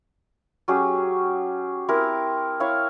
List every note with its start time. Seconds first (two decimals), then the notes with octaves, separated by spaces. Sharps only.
0.68 F#3 C#4 G4 G#4
1.88 C4 E4 G4 A#4
2.60 E4 C#5 F5